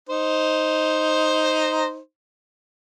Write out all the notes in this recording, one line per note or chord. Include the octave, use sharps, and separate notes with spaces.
D#4 C5